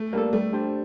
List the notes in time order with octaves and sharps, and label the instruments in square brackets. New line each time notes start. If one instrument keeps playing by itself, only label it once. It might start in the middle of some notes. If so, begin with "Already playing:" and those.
Already playing: [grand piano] A3
[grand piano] G3 [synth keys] A#3 D4 A4
[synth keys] G3 [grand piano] A3
[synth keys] D4 G4 C5